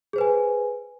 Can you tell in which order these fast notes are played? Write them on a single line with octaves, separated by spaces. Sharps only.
G#4 C5 B4 G#5